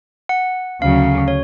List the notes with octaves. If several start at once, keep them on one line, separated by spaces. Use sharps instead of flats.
F#5
D2 C#3 F#3 F5
C#5